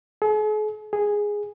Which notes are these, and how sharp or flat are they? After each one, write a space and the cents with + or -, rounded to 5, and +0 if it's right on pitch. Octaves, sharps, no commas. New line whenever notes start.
G#4 +45
G#4 -5